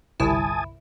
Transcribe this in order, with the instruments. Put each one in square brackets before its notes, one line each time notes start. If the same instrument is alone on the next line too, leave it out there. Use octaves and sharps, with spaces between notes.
[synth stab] G1 C2 E4 [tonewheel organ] G#5 A5 D#6